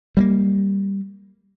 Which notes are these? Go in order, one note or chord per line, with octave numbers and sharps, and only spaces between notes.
G3 A3 A#3